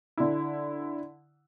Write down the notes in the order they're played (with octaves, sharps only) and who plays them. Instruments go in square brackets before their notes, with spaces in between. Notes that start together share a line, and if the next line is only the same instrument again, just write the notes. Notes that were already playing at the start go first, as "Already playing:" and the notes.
[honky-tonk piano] D3 E4